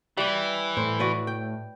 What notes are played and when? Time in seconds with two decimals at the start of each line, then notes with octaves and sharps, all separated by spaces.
0.17 E3 G3 G4
0.77 A2 C5
0.99 F#4 B4 D5
1.27 G5